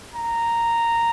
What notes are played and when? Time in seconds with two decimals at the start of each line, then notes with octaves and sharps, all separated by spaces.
0.15 A#5